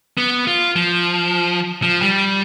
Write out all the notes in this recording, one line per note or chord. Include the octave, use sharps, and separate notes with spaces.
B3
F4
F3
F3
G3